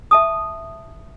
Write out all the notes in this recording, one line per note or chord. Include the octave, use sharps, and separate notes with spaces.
E5 A5 D#6